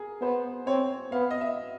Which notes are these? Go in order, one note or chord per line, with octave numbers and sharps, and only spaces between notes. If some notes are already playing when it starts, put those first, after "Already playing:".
Already playing: G#4 A#4
B3 C5
C4 C#5
B3 F5
D#5
E5